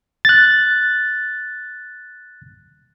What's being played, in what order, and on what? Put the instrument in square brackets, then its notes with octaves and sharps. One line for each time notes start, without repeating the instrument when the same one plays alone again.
[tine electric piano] F#6 A6